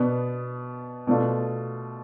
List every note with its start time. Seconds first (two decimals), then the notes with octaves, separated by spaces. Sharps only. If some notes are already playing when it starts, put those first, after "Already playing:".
Already playing: B2 B3 D4
1.07 B2 A3 D4 F4